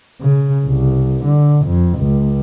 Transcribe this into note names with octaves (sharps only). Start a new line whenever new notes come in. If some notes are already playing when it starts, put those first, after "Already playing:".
C#3
C2
D3
F2
C#2